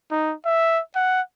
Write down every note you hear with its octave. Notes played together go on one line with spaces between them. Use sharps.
D#4
E5
F#5